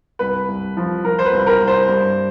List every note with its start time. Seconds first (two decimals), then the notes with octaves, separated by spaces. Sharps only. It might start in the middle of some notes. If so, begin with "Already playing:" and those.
0.19 C2 B4
0.48 C2
0.77 F3
1.04 F3 A#4
1.19 C5
1.25 B4
1.32 C2
1.47 A#4
1.61 C2
1.67 C5
1.88 G2